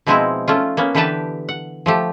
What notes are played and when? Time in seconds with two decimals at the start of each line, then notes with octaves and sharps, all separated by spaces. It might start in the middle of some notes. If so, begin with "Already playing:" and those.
0.06 B2 F3 G#3 C4 D#4 E4
0.48 A3 C#4 F4
0.77 A#3 B3 C#4
0.95 D3 E3 G4 B4 G5 A5
1.49 F#5
1.86 F3 A3 G4